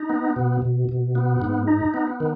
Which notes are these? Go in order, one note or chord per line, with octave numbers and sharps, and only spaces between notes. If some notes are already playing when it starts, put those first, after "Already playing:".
Already playing: D#4
B3
B2
B2
B2
B3
G#2
D#4
B3
D#3